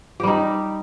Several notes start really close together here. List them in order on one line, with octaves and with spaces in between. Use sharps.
G4 G3 D#4